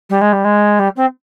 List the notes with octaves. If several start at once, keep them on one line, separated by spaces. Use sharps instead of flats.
G3
G#3
G3
G#3
G3
C4